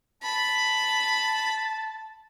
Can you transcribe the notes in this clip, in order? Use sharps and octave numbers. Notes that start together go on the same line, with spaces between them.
A5 B5